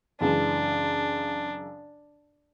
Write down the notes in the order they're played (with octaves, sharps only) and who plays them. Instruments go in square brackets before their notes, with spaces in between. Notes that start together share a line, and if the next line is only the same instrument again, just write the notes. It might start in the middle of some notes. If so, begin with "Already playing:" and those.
[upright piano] F#2 C#3 E3 G#3 [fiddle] D4